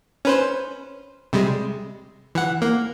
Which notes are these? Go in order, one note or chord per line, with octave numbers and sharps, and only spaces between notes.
C#4 B4 C5
C3 G3 G#3
E3 F#5
A#3